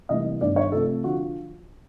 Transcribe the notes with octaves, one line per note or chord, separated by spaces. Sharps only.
C3 E3 G3 A#3 D#5
G2 D#3 G3 B3 D5
C#5
C3 F3 A3 C4 A4
D3 F3 F#4